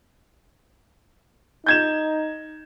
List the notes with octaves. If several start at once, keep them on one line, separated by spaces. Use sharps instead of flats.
D#4 G6 G#6 E7